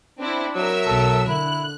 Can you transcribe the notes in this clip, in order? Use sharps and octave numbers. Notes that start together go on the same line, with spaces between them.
C4 D4 E4
F#3 A#4 E5 E6
B1 A4
D3 E4 F#6